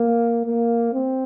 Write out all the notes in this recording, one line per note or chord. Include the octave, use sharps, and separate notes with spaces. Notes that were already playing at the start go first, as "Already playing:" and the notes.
Already playing: A#3
A#3
C4